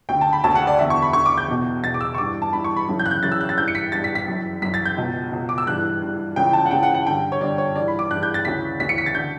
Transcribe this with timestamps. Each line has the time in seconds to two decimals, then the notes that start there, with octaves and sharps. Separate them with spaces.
0.09 D2 D3 G5
0.21 A5
0.33 B5
0.44 D2 D3 A5
0.55 F#5
0.67 D5
0.79 E2 D3 E5
0.90 C#6
1.02 B5
1.13 E2 D3 C#6
1.26 D6
1.38 G6
1.48 E2 B2
1.84 E2 B2 A6
1.94 D6
2.01 E6
2.15 C#6
2.18 G2 E3 D6
2.42 A5
2.53 G2 E3 B5
2.64 C#6
2.76 B5
2.88 F#2 C#3 E3
2.99 G6
3.06 F#6
3.11 G6
3.23 F#2 C#3 E3 A6
3.32 E6
3.41 F#6
3.49 A6
3.57 G2 E3 G6
3.68 C#7
3.75 B6
3.92 G2 E3 A6
4.04 B6
4.15 B6
4.28 F#2 E3
4.62 F#2 E3 B6
4.74 A6
4.85 G6
4.97 C#2 B2
5.32 C#2 B2
5.49 D6
5.58 E6
5.67 G2 E3 F#6
6.02 G2 E3
6.36 C#2 C#3 E3 G5
6.53 A5
6.66 F#5
6.71 C#2 C#3 E3 G5
6.83 F#5
6.95 F#5
7.06 D3 G5
7.10 G2
7.32 C#5
7.41 G2 D3 D5
7.58 C#5
7.76 G2 E3 D5
7.88 B5
7.99 D6
8.10 G2 E3 F#6
8.23 G6
8.34 A6
8.45 D2 C#3 E3 B6
8.80 D2 C#3 E3 B6
8.89 C#7
8.98 B6
9.06 A6
9.15 D3 G6